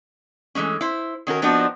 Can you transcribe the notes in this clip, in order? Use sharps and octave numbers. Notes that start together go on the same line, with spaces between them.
E3 G#3 A3 C#4
E4 C5
D#3 C#4 F#4 A#4
F3 B3 C4 D4 D#4 F#4